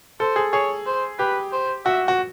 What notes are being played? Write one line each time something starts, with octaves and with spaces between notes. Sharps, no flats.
A4 C5
G#4
G#4 C#5
C5
G4 B4
C5
F#4 E5
F#4